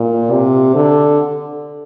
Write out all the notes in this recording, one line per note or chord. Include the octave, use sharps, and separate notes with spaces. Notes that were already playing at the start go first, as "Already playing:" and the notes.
Already playing: A#2
C3
D3